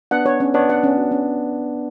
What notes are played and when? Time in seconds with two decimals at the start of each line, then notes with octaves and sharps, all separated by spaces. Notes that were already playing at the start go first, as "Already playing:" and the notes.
0.11 B3 D4 F#5
0.26 C#5
0.40 C#4
0.54 B3 D4 C#5
0.69 F#5
0.83 C#4
0.97 F#4
1.11 C#4